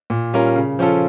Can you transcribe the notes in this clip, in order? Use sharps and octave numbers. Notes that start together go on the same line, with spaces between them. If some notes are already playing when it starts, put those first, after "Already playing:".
A#2
G3 C#4 F4 A#4
C#3
F3 C#4 F4 A4